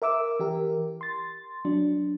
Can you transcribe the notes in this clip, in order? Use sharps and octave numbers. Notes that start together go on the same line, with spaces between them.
A#4 E5 D6 E6
E3 G4 A#4
C6 A6
F#3 D4